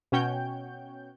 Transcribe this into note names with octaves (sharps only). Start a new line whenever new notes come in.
B2 C#4 F#4 C#5 G5 G6